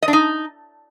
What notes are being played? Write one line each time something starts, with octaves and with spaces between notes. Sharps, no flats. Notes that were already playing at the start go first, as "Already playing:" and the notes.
D#5
D4
D#4